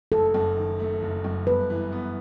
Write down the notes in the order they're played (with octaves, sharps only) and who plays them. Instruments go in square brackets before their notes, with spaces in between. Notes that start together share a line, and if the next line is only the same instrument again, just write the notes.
[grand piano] F#1 [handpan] A4
[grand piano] F#2
D#3
A3
F#1
F#2
[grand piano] G2 [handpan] B4
[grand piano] E3
B3